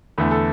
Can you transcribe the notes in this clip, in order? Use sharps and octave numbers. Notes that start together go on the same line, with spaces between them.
E2 D3 A3 B4
A4